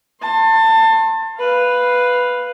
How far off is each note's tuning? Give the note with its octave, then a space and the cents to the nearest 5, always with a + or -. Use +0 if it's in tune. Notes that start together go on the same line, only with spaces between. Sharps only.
A5 +25 C6 +25
B4 +0 F5 +0